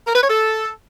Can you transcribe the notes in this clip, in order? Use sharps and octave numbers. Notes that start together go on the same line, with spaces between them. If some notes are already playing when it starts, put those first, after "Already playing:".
A#4
B4
C#5
A4